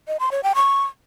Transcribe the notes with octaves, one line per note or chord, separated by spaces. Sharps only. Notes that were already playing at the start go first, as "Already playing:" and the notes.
D#5
C6
C#5
G5
C#6